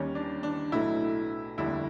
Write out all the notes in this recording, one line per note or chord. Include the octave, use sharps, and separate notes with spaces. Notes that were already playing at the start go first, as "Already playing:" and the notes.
Already playing: D#2 D#3 G3 C#4
D4
D4
B1 A2 F#3 A3 E4
F1 D#2 D3 G3 E4